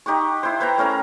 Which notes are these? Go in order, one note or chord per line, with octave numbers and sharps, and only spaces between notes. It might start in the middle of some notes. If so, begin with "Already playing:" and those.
D#4 G4 F#5 C#6
E4 C5
B4 C5 G5 A#5
A3 C#4 A#4 A#5